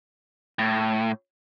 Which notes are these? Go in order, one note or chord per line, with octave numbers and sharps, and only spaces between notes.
A2